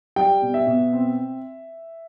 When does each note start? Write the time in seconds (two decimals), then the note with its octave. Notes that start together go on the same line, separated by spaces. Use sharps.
0.16 G3 G5
0.42 B2
0.54 E5
0.67 B2
0.93 C4